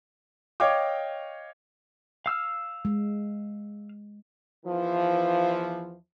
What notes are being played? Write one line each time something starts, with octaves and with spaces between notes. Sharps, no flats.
C#5 D#5 F5 G5 D6
F5 E6 F6
G#3
E2 E3 F3